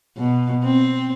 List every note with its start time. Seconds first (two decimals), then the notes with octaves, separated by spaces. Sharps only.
0.17 B2
0.64 C4